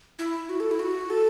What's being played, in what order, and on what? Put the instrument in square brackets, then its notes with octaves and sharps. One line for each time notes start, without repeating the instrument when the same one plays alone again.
[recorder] E4
F#4
A4
E4
F#4
A4